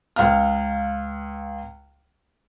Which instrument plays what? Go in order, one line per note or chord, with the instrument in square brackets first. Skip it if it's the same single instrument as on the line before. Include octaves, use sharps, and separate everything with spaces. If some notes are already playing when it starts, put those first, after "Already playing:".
[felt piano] C#2 F5 F6